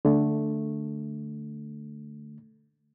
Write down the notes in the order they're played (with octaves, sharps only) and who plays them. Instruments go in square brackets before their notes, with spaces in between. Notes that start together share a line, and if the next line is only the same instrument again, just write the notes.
[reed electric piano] D3 A3